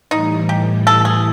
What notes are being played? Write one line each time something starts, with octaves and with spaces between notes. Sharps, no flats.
A2 E3 G3 D#4
G4
A4
G#4